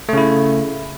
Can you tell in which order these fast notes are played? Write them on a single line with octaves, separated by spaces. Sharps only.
A3 C#3 E4